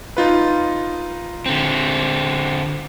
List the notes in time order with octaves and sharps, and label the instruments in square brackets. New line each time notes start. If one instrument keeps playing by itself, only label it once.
[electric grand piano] D#4 F4 B4
[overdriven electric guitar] D3 C4